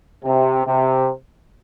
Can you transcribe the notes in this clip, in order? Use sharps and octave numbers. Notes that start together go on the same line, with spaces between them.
C3
C3